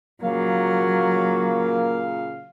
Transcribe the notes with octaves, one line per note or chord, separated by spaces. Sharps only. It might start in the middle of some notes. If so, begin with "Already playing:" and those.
A#2 C#3 F#3 A#3 F5